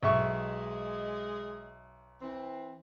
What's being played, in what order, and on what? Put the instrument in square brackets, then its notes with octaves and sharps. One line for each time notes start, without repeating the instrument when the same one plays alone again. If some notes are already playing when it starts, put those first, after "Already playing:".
[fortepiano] B1 E5 C#6 [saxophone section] G#3 D#5
[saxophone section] E3 C4